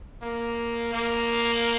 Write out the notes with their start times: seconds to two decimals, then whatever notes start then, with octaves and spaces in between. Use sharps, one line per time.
0.22 A#3
0.93 A#3